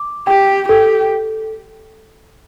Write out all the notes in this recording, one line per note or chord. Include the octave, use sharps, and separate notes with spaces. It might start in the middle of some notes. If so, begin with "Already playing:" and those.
Already playing: D6
G4 G5
G4 A4